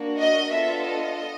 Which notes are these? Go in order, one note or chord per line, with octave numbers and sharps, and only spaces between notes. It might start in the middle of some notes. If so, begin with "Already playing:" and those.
Already playing: A#3 D4 F#4
D#5
B3 D4 F4 A4 E5
D#5